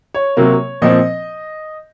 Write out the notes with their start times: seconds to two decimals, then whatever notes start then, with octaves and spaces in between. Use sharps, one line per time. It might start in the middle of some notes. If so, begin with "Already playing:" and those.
0.15 C#5
0.37 C3 F#3 A#3
0.82 A#2 F3 C4 D#5